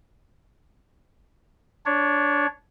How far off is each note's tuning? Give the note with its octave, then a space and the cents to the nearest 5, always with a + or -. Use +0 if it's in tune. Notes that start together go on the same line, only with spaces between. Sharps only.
D4 -15 C#5 +0